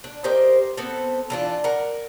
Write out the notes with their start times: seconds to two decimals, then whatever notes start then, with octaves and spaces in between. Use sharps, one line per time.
0.04 D4
0.24 G4 A#4 C5 D#5
0.77 B3 C4 A4
1.30 E3 D4 F4
1.64 A#4 F#5